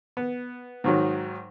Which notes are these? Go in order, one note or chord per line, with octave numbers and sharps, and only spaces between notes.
B3
G#2 D#3 F#3